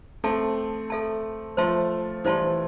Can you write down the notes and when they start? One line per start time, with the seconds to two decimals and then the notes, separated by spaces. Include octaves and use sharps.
0.24 A3 C4 A4 E5 A5
0.90 A4 E5 A5
1.57 F3 A3 C5 E5 A5 C6
2.24 E3 G3 C5 E5 A5 C6